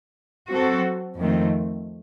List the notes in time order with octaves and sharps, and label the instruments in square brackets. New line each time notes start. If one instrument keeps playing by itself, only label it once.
[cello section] F#3 C4 F#4 A4
F2 D#3 A3 C4